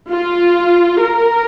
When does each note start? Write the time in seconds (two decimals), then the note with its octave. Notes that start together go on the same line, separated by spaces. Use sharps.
0.10 F4
1.02 A#4